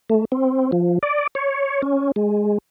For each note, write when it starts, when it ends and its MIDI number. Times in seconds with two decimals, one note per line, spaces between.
0.10 0.25 57
0.32 0.71 60
0.72 0.99 53
1.03 1.27 74
1.35 1.82 73
1.82 2.12 61
2.16 2.58 56